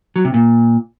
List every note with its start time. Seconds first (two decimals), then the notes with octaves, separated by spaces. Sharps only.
0.16 F#3
0.25 C3
0.34 A#2